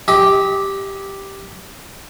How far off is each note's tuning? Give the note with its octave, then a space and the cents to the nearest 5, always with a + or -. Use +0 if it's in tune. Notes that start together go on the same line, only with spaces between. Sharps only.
G4 +0 D#5 +35